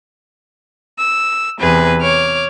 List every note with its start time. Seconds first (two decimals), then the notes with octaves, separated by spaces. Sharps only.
0.99 E6
1.59 E2 C3 G#4 B4
2.02 C#5 D6 F6